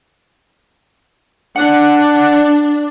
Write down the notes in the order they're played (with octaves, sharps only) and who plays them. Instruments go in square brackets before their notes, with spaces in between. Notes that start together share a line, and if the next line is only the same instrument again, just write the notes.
[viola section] D4 [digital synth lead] F#5